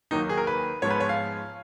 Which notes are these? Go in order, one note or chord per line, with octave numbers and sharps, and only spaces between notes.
D#2 D#3 F#3 A#3 D#4
G#4
A#4
B4
G#2 F3 G#3 B3 C#5
B4
C#5
F5